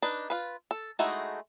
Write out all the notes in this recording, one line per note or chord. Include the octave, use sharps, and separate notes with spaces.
D4 D#4 B4
F4 B4
A4
G#3 A3 D#4 E4 F#4